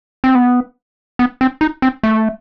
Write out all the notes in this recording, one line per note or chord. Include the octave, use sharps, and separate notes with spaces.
C4
B3
B3
C4
D#4
C4
A3